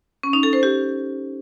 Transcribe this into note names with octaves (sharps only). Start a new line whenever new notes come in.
C#4
D#4
A4
C5
G4